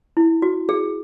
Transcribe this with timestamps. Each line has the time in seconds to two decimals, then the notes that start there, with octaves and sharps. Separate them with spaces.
0.17 E4
0.42 F#4
0.69 G#4